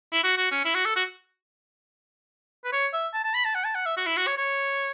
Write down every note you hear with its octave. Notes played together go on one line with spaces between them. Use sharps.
E4
F#4
F#4
C#4
E4
F#4
A4
F#4
B4
C#5
E5
A5
A5
B5
A5
F#5
A5
F#5
E5
F#4
E4
F#4
C#5
C#5